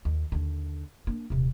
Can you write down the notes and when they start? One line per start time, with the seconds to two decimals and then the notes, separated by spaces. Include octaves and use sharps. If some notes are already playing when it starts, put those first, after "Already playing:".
0.05 D#2
0.32 D#2 D3
1.07 A#3 D4
1.30 D#1 C3